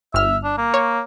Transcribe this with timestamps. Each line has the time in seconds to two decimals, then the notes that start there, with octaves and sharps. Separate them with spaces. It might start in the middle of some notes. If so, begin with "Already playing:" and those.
0.14 G1 E5 F6
0.44 D4
0.58 A#3
0.74 C#5